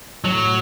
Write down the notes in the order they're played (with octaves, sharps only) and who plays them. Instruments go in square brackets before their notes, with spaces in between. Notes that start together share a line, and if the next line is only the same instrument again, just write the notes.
[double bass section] A2 [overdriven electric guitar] F#3